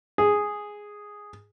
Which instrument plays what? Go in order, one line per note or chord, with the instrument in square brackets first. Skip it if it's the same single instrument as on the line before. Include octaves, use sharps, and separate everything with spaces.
[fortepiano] G#4